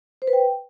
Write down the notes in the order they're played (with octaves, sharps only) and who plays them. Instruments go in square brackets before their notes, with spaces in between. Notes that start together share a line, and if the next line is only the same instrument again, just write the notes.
[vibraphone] C5
B4
G5